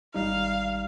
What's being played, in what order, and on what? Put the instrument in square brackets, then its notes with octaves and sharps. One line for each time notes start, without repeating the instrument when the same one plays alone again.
[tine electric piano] G#1 G3 D#4 [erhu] F5